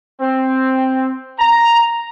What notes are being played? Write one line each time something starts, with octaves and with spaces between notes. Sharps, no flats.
C4
A#5